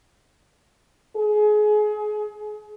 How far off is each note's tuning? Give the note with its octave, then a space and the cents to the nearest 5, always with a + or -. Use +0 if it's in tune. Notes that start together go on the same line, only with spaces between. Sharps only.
G#4 +30